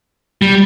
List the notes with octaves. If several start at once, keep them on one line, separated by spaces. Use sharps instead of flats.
G3